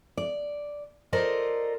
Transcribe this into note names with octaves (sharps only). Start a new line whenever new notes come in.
D5
F4 A4 A#4 C5 D5 D#5